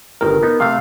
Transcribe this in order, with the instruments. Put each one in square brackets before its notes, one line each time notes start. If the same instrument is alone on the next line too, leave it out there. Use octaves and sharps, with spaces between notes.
[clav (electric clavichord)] G1 D#3 [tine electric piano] A#4
[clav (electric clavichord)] B3 D#4
[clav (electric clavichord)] C3 A3 [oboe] F5